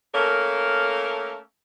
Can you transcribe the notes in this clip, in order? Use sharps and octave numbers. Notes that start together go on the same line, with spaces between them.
A3 A#3 C#4 A4 A#4